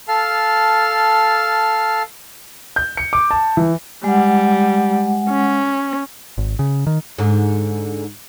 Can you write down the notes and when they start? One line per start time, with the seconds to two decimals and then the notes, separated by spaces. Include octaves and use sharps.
0.08 A4 F5 A5 F6
2.76 G6
2.97 C#7
3.13 D6
3.31 A5
3.57 E3
4.04 G3 G#3 F#5
5.29 C#4
6.38 G#1
6.59 C#3
6.87 D#3
7.18 G#2 D3